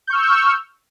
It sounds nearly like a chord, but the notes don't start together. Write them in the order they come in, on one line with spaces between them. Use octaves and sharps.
G6 C#6 F6 E6